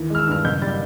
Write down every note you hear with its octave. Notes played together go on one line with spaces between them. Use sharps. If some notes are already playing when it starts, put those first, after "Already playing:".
Already playing: D#2 E3
G#3 F6
E6
G2 F6
F#1 G6
G3 A6